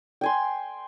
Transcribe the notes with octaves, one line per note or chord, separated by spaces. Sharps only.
G5 G#5 C6